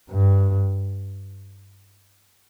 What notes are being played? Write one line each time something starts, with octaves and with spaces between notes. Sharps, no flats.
G2